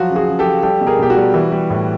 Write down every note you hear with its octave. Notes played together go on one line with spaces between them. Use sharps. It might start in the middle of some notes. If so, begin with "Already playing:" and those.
Already playing: F3 F#3 F#4
C#3
F#4 G#4
C#3
G4 A4
F3
G3 G4 A4
B2
G#4 A#4
B2 G4
F#4
G3
E3
G3
A2